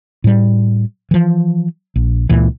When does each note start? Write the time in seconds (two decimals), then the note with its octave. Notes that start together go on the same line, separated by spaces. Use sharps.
0.24 A2 G3
1.11 E3 F3
1.96 A#1
2.29 C#2 A#2 E3